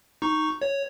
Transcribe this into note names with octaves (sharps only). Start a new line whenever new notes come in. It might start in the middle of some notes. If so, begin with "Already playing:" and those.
D#4 C#6
C#5